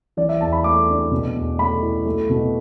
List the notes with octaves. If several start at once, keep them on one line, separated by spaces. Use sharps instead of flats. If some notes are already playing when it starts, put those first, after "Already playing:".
E3 D5
E5
E2 A5
B5
A3 D6
D4
B2
E2
A3 B5
E4
A3
B2